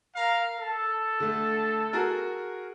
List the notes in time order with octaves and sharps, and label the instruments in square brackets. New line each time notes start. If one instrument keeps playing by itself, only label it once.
[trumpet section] A#4 F5 A#5
A4
[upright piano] D3 A3
F#4 G#4 A#4